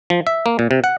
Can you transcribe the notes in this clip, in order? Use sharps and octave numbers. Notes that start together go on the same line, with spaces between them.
F3
E5
A#3
A#2
C3
F#5